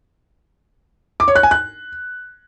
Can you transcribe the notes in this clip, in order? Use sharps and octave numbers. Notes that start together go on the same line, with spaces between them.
D6
C#5
F#6
G#5
F#6